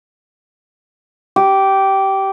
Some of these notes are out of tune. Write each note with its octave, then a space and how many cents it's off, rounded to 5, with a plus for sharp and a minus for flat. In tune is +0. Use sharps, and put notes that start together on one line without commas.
G4 -15